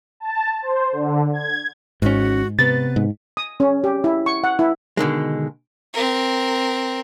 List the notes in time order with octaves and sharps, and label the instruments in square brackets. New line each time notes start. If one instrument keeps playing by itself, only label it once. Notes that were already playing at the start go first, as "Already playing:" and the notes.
[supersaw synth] A5
C5
D3
G#6
[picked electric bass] G#1 C#4 [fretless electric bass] G#2 [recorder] F#4
[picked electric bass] C3 B3 [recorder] B4 [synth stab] A6
[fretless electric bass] G#2
[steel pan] D#6
C#4
G4
E4
C#6
F#5
E4
[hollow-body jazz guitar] B2 D3 D#3 G#3
[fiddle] C4 A#4